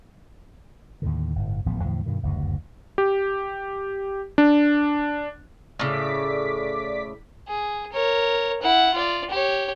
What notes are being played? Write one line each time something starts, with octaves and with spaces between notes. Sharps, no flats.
D#2 A2 D3
G1 A2
D1 A1 F3 B3
E2 A2 D3 F3
G2 B2 D#3
F#1 D2 G2
G4
D4
A2 C#3 D5 D6 B6
G#4
A#4 C#5
E4 F#5
F4 D5
G4 C#5